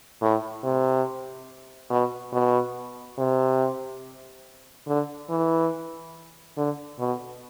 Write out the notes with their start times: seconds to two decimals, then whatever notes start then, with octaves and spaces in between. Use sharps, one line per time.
0.22 A2
0.64 C3
1.90 B2
2.32 B2
3.18 C3
4.87 D3
5.30 E3
6.57 D3
6.99 B2